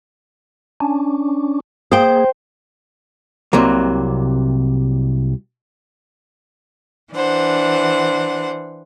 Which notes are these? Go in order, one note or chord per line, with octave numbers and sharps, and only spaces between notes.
C#4 D4
A#3 G#4 C5 G5
C2 C3 F#3 A#3
E3 D4 C5 F#5